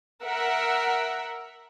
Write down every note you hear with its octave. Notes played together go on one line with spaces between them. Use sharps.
A#4 E5 F#5